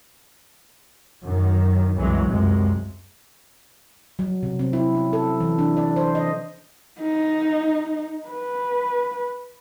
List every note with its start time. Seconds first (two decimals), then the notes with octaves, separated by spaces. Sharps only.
1.24 F#2 D#3
1.96 C2 F#2 E3 F#3 G#3
2.26 C#2 F#2 C3 G#3
4.19 F#3
4.43 C3
4.59 C4
4.73 E4
4.95 C#4
5.13 A4
5.40 E3
5.59 D4
5.77 D5
5.96 C5
6.15 D#5
7.01 D#4
8.29 B4